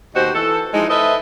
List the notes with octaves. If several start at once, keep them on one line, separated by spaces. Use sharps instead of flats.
D#2 B2 D#4 F#4 G4 C5
E3 A4
E3 F3 G#3 D#4
A4 B4 C5 D#5 E5